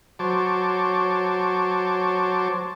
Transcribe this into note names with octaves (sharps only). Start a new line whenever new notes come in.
F#3 C5 C#5 A5 D6